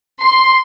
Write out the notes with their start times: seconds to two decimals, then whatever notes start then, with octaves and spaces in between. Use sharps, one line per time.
0.22 C6